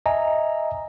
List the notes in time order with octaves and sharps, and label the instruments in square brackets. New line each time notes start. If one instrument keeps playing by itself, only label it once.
[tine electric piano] D#5 E5 G#5 A#5